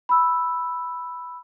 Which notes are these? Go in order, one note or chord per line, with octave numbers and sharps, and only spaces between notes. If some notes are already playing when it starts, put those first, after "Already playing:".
B5 E6